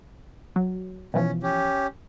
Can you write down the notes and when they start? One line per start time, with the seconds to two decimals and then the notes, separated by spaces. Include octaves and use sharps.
0.56 F#3
1.14 B2 E3 F3 C#4
1.43 C#4 G4